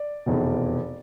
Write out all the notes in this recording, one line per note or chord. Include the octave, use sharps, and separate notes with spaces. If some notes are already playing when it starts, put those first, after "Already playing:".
Already playing: D5
F1 E2 B2